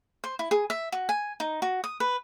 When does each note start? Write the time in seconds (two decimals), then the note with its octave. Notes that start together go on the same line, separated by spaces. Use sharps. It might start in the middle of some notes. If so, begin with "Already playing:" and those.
0.24 C5
0.39 E4
0.51 G#4
0.70 E5
0.92 F#4
1.09 G#5
1.40 D#4
1.62 F#4
1.84 D#6
2.00 B4